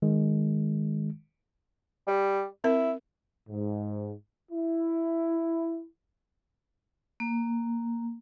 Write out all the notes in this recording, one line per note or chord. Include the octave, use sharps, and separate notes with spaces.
D#3 G#3
G3
C4 E4 A#4
G#2
E4
A#3